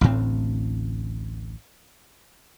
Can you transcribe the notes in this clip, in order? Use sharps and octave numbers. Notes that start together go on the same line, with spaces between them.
A1 D2 A2 C4